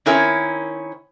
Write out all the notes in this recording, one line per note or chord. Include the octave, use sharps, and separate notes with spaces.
D#3 C4 C#4 E4 A#4